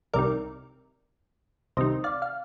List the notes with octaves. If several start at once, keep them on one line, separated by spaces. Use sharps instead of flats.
C2 C3 D#3 A#4 D5
C2 C3 D#3 C5 D#5
D5 F5
F5